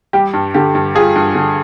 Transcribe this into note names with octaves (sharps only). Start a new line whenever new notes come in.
G3 G4
G2
D3 G4
G2
G3 F4 G#4
G2
D3